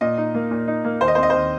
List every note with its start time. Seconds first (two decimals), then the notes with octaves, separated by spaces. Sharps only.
0.01 A#2 D#5
0.18 D#4
0.35 A#3
0.51 A#2
0.68 D#4
0.85 A#3
1.00 D#2 C5
1.08 D#5
1.15 C5
1.18 C4 D#5
1.30 D#2 C5